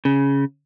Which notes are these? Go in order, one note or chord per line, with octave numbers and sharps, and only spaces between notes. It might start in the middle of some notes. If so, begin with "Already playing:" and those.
C#3